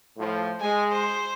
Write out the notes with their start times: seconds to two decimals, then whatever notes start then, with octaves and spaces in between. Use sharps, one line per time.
0.17 A2 F3
0.60 G#3 G#5
0.91 C5